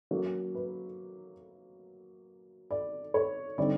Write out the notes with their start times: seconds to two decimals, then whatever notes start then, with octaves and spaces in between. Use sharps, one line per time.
0.11 F#3 A#3 C#4
0.55 B4
2.71 D5
3.14 C#5
3.58 D3 G3 C4 D#4 D5